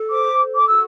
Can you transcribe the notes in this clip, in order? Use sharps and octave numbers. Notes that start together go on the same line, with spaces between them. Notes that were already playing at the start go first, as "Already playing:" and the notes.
Already playing: A4
C5 D6
A4
D6
F#4 E6